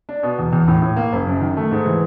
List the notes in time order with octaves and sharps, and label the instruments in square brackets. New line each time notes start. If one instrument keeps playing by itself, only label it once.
[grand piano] D4
B2
E2
E2
A2
A2
A#3
F#1
F#2
D#3
A3
G#2
E3